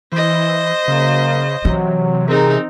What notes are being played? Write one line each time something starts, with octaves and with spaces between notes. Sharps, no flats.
E3 C5 D#5
F#2 C#3 A#3
C3 E3 F#3
C4 D#4 G#4 A#4